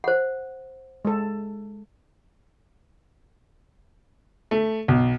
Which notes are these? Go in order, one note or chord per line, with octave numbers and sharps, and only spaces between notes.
C5 F#5
G#3 A4
A3
B1